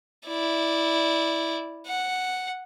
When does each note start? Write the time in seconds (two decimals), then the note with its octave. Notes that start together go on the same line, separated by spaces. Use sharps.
0.27 E4 D5
1.87 F#5